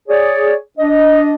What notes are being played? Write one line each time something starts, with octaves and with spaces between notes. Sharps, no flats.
G#4 C#5 D5
D4 D#5